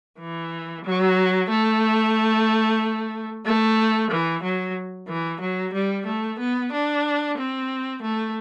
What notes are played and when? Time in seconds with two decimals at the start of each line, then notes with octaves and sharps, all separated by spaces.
0.20 E3
0.85 F#3
1.50 A3
3.46 A3
4.11 E3
4.43 F#3
5.08 E3
5.41 F#3
5.73 G3
6.06 A3
6.39 B3
6.72 D4
7.38 C4
8.02 A3